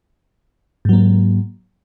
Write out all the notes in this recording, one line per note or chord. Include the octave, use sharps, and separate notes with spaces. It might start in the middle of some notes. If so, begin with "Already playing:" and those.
G#2 F#3 A#3